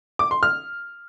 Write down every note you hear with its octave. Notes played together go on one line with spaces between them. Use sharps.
D6
C6
F6